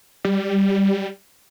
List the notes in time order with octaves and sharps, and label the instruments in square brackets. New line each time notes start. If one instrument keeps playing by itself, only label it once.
[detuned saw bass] G3